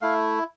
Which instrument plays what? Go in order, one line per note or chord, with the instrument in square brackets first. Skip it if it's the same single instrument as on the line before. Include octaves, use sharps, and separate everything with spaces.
[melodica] A3 E4 F5